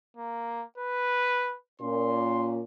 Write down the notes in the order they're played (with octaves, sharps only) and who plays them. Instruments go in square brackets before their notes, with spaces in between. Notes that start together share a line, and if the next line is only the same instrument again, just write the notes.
[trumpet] A#3
B4
[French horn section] A#2 C#4 [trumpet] C6